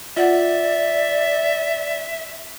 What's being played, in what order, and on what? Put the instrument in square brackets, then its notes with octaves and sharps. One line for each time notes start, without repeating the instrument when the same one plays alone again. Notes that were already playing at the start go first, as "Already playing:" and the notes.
[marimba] F4 F#5 [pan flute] D5 [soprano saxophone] E5